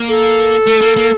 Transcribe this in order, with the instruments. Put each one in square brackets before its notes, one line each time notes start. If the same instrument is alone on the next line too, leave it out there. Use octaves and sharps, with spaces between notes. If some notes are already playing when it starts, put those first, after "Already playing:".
Already playing: [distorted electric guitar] A#3
[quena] A4
[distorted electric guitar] A3
A#3
A#3